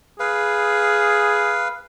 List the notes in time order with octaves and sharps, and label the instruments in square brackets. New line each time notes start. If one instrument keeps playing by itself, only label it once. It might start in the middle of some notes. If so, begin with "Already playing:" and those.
[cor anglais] G#4 [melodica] B4 F5